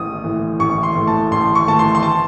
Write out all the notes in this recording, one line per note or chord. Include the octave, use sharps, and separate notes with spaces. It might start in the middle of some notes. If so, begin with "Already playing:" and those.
Already playing: A1 E3 D#6
A2 E3
A1 C#6
C6
A2 E3
A5
A1 C6
C#6
A2 E3 A5
C6
C6
A5